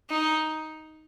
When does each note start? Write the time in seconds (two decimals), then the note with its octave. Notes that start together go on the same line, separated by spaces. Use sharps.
0.10 D#4